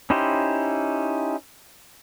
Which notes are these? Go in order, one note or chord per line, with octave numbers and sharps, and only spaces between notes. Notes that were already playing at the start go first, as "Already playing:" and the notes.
C#4 D#4 E4 G4 C5